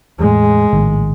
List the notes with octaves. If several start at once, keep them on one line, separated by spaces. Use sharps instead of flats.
E2 A2 G#3
A#1 A2 D#3